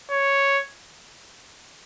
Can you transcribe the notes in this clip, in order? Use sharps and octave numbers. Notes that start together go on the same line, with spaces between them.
C#5